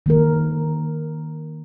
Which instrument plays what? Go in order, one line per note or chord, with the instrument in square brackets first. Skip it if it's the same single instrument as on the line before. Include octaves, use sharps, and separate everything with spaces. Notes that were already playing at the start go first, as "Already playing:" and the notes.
[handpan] D#3 A#3 A#4